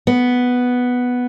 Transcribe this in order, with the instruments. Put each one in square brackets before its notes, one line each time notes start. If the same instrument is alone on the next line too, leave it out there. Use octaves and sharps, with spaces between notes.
[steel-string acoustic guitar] B3